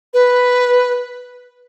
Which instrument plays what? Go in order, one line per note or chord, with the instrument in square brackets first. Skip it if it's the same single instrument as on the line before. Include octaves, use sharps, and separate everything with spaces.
[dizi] B4